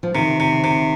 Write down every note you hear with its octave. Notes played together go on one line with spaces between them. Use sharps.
F3
C3 D#3
C3
C3